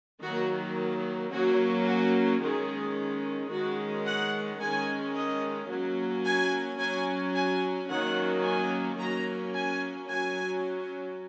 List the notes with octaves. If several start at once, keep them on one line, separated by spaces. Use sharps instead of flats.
D#3 F#3 A#3 F#4
F#3 A#3 C#4 F#4
F#4
D#3 G#3 C#4 G#4
D#3 G#3 C#4 F#4
F#5
D#3 G#3 C#4 G#5
D#5
F#3 A#3 C#4
G#5
F#3 C#4 G#5
G#5
D#3 F#3 A#3 C#4 F#5
G#5
F#3 A#3 C#4 A#5
G#5
F#3 C#4 G#5